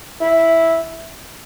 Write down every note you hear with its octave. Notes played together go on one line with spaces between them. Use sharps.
E4